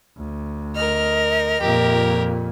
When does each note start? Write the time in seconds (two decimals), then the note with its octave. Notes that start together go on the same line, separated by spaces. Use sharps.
0.18 D2
0.75 A#4 D#5 F6
1.60 F2 A#2 G4 A#4